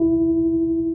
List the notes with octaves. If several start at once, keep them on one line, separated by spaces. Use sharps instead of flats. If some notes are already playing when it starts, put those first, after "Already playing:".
Already playing: E4